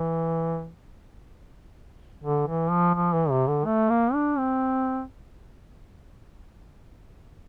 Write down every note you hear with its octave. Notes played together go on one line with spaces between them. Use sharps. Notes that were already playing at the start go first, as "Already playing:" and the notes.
Already playing: E3
D3
E3
F3
F3
E3
C3
D3
A3
A#3
D4
C4